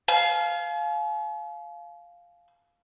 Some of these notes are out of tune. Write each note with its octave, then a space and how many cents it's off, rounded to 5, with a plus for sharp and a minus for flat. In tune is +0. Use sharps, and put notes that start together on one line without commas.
F5 +0 G#5 +45